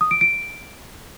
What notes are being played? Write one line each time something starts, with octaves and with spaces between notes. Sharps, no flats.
D#6
D7
D7